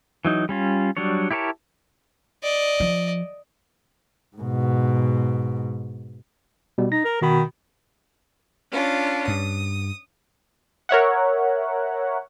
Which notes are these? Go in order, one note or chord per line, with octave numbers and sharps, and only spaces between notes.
E3 F#3 D#4
G3 C#4 F4
F#3 G3 D4 C#5
E4 G4 A#4 C#5 A5
D5 D#5
F3
G#2 B2
B2 G3
D#4 A#6
A#4
B2 D#3 F#4 B5
C#4 D4 F4
G2 D#6
A#4 C#5 E5 F#5